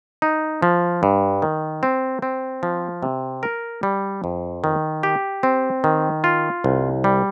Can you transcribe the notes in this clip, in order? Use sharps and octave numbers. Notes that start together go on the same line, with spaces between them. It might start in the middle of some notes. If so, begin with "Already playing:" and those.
D#4
F3
G2
D#3
C4
C4
F3
C3
A#4
G3
F2
D#3
G4
C4
D#3
F4
C2
G3